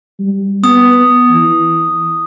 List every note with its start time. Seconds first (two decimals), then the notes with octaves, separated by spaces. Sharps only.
0.19 G3
0.64 B3 D#6
1.31 E3